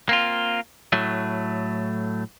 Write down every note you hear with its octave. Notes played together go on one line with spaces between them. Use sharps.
A#3 C4 F4
A2 F#3 A3